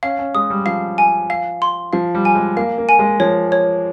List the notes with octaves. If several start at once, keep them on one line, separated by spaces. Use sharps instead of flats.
C#4 F5
C#4
G#3 D#6
G3
F3 F5
G#5
F5
C6
F3 F5
G3
G#5
G#3
A#3 F5
A#3
G#5
G#3
F3 C#5
C#5